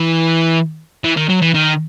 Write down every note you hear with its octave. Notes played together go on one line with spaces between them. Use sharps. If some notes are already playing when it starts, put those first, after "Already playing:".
Already playing: E3
E3
D#3
F#3
E3
D#3